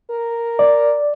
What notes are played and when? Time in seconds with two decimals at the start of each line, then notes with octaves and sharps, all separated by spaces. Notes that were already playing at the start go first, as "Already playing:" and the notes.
0.10 A#4
0.59 D5